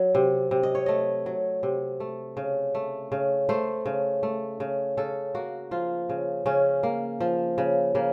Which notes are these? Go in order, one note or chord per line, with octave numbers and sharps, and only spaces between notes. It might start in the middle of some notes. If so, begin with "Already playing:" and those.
Already playing: F#3
C3
C3
D#5
C#5
A3 D#5
F#3
C3
A3
C#3
A3
C#3
A3 C5
C#3
A3
C#3
C#3 A4
A#3 F#4
F3 F4
C#3
C#3 C#4
A#3
F3
C#3
C#3 A#3